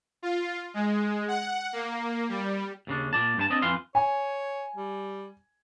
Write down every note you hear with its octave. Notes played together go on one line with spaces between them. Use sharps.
F4
G#3
F#5
A#3
G3
D#2 C#3 D4
A#2 D5 A5
G2 C5 A5
C4 D4 D#5 A5
F2 E3 F5 C6
C#5 G#5
G3